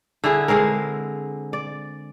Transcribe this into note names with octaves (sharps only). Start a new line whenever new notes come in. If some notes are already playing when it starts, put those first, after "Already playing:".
D3 E4 G#4
D3 G#3 C4 A#4
D5